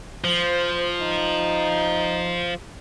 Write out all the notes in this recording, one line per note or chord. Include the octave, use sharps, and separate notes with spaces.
F3 C5
D#4